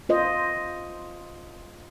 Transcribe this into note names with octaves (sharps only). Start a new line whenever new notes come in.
F4 C5 D#5